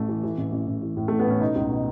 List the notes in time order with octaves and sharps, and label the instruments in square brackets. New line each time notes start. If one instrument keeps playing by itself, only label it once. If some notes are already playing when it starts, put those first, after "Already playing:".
Already playing: [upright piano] A1 A3
E3
E3
A1
A1
A1
E3
A2
A1 A3
B3
A1 C#4
B2 D#4
C#2
B2